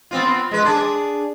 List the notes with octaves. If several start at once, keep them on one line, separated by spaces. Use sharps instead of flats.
B3 C4 F4
G#3 B4
D4 G#4 D5